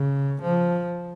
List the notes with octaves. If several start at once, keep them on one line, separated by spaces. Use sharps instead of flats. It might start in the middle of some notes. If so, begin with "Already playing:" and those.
Already playing: C#3
F3